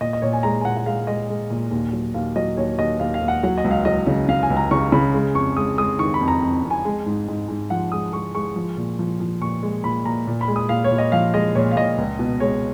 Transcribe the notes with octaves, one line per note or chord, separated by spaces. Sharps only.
A#2 D#5
D#5
A#2 C#5
G#5
G#3 A#5
G#5
A#2 F#5
F#5
G#3 F5
G#3 D#5
G#3
A#2
D#2
F#3
D#2 F5
F#3 D#5
D#2 C#5
D#2 D#5
D#2 F5
F5
D#2
F#5
F#3 F#5
D#5
C#2
F5
F#3 D#5
C#3
C#3 F5
G#5
C#2
A#5
C#3 C#6
C#3 B5
G#3
F2 C#6
G#3 D#6
G#3 D#6
D#3 C#6
B5
F2
A#5
F2
F2
G#5
G#3
G#2
G#2
G#2
F3 F#5
G#3 D#6
G#3 C#6
G#3 C#6
F3
A#2
F3
F3
A#2 C#6
G#3
A#2 B5
A#2 A#5
A#2
B5
G#3
D#6
A#2 F5
C#5
A#2
D#5
F3 F5
G#3 D#5
A#2 C#5
F5
A#2 D#5
C#2
B2
G#3 C#5